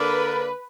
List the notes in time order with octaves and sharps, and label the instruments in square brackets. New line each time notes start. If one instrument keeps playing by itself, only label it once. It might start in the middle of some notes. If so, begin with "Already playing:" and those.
Already playing: [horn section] D3 A#3 D4 A#4 D5 [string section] B4